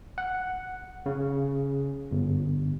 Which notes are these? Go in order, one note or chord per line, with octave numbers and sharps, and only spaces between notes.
F#5
C#3
G1